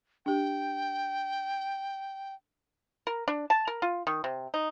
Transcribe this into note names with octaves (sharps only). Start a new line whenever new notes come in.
D4 G4 G5
A#4
D4
A5
A#4
F4
D#3
C3
D#4